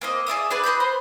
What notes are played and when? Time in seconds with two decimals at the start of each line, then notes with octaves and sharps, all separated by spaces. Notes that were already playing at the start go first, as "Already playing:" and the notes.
0.01 A#3 C4 D#5
0.27 G#4 D5 E5 D#6
0.50 D4 G#4 B4
0.64 B4 D#5 B5 G6
0.80 C5